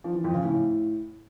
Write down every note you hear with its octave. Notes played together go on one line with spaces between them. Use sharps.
F3
E3
F2
C#3
A2